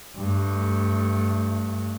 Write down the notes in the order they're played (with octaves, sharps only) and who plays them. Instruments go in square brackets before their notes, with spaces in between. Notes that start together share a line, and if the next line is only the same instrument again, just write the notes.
[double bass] G2 A3